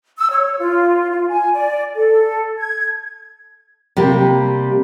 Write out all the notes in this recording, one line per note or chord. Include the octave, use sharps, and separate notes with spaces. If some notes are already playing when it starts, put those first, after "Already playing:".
E6
C#5
F4
F4
G#5
D5
A4
G#6
C3 G3 A#3 G4